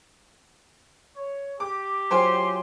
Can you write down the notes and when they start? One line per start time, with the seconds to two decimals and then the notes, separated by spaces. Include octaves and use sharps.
1.16 C#5
1.60 G4 D6
2.11 F#3 F4 C5 G5 G#5 C6